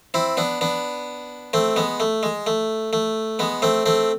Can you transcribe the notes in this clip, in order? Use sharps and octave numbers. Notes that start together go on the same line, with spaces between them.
C4 E4
B3 D4
B3 D4
A3 C4
G#3 B3
A3
G#3
A3
A3
G#3 B3
A3 C4
A3 C4